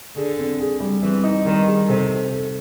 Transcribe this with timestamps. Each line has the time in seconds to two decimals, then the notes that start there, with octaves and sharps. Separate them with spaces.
0.16 D3 G#4
0.38 C4
0.60 G#4
0.80 G3
1.02 E3 C4
1.24 D#4
1.46 D#3 G3
1.67 G#4
1.88 C3 A4
2.11 A4
2.32 A4